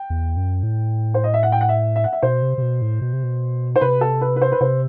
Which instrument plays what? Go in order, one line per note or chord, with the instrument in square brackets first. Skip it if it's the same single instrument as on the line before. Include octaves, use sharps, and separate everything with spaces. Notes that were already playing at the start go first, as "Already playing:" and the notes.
Already playing: [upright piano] G5
[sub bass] E2
F#2
A2
[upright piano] C5
D#5
E5
F#5
G5
F#5
E5
E5
F#5
E5
[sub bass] B2 [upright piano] C5
[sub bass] C3
C3
B2
A2
B2
C3
B2
[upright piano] C5
[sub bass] C3 [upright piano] B4
[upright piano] A4
B4
B4
C5
B4
[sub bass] C3 [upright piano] C5